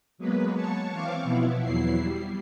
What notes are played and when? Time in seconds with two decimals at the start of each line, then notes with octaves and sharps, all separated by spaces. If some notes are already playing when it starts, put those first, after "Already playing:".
0.18 F#3 G#3 A#3 B3 B4
0.55 C#5 A5 C#6
0.91 E3 C4 F5 C#6 D6
1.23 B2 F3 B3 E4
1.62 E2 F#3 E4 C7
1.99 G3